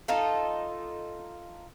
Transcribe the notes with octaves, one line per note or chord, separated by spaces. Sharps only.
D#4 F4 A4